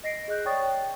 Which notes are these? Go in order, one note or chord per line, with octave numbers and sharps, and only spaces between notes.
D#5 A#6 C7 D7
G#4 D#5 F#6 G6
C#5 D5 G5 C#6 D#6 A6
C#5 G5